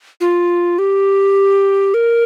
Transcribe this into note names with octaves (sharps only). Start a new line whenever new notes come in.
F4
G4
A#4